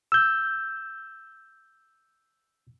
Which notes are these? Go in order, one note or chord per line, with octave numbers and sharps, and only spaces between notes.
E6 G6